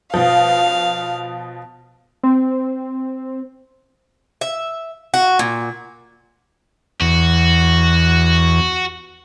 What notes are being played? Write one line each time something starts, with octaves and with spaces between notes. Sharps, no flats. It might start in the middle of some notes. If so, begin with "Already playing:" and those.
B2 F3 F5
C4
E5
F#4
A#2
E2 F#4